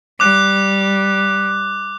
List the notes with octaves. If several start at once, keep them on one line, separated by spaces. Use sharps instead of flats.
G3 D6 F#6